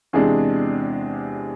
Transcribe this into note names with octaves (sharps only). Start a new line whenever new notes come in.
E2 C3 G#3 D4 G#4